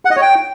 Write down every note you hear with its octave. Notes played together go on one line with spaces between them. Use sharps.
F#5
D#5
C#5
G5